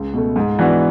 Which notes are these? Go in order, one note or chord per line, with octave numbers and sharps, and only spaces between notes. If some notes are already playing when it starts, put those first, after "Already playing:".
Already playing: C#2
B2 A3
G#2
E3 B3 D4 F#4